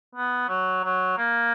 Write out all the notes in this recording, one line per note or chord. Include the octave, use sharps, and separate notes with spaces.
B3
F#3
F#3
A#3